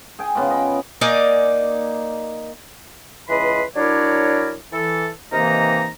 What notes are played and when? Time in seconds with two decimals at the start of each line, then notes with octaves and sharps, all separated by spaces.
0.19 G#4 G5
0.35 C#3 B3 F4 D6
0.50 D#5 B5
1.01 A#3 D#4 D5 G#5
3.29 C#2 E3 B4 D#5 B5 C6
3.77 F#3 D4 E4 A#4 C#5 D5
4.73 E3 A4
5.33 C3 D#3 E3 A#3 D#4 A#5